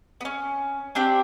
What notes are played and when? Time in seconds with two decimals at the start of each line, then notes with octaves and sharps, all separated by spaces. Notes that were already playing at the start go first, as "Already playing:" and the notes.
0.21 B3 C#4
0.95 C4 D4 G4 G5